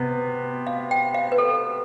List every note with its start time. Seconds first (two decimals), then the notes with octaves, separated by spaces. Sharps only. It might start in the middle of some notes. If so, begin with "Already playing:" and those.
Already playing: C3 B3
0.67 F5
0.91 G5
1.14 F5
1.32 B4
1.38 A4